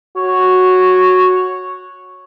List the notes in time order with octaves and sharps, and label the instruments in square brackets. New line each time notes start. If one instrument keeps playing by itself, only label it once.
[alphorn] F#4 [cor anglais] C#5